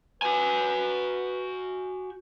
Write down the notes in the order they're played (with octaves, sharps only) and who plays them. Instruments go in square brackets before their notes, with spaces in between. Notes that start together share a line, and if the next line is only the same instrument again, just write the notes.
[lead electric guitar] F#4 G#5 [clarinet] B4